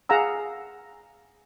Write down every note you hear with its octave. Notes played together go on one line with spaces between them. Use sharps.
G#4 F5 F#5 A#5 E6